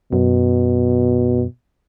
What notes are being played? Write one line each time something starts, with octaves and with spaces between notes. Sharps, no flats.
F#2 B2